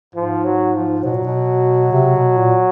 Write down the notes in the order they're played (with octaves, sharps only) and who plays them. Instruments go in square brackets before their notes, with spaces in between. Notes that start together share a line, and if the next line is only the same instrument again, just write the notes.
[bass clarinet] G#2 [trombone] F3
[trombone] F#3
F3
[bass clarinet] B2 [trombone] F#3
[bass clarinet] A#2
B2
C3
B2
A#2